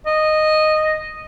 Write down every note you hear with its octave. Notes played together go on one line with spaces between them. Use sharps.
D#5